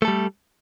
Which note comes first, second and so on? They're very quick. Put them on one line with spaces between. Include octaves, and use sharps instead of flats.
A3 A4 G3